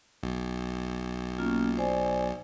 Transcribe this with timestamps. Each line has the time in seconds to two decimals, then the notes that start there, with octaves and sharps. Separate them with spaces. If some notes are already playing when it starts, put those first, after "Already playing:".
0.23 B1
1.38 A#3 C#4 F4
1.77 C5 D5 G#5